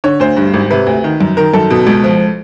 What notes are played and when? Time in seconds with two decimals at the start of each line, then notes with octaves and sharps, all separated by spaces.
0.04 D3 C#5
0.20 D2 C5
0.37 G2
0.54 G#1
0.70 C3 B4
0.87 D2
1.04 D#3
1.21 F#2
1.37 D#3 A#4
1.54 F#2 A4
1.70 B2
1.87 C#2
2.04 F3